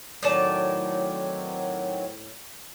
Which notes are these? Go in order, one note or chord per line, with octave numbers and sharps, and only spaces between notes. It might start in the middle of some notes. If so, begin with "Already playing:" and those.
A2 D#3 F#3 C4 D5 A5